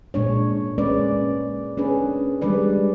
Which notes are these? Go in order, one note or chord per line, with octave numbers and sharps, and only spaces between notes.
A#2 G#3 D4 C#5
G#3 C#4 B4 D5
C#4 D4 G#4 B4
G3 G#3 D4 B4 D5